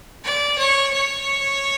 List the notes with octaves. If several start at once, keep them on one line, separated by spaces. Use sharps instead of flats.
D5
C#5
C#5